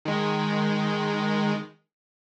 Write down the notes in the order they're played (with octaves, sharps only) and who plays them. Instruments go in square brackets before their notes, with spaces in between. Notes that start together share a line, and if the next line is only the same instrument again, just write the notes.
[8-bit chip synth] D#3 G#3